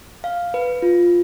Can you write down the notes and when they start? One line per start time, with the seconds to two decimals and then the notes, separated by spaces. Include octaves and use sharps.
0.24 F5
0.54 B4
0.82 F4